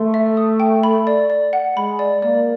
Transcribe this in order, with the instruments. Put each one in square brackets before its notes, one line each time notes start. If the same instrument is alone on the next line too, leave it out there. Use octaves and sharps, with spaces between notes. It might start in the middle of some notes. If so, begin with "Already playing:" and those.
Already playing: [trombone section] A3 [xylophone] C6
[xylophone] E5
D#6
G5
B5
D5
D5
F#5
[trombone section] G#3 [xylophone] B5
[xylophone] D5
[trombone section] A#3 [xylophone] D5